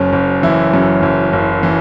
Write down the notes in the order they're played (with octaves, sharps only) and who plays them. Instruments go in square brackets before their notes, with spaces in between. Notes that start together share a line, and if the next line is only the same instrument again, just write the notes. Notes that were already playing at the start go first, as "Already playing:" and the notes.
Already playing: [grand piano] F#1 F#2 C#4
F#1
E3 E4
F#2
F#1
F#1
E3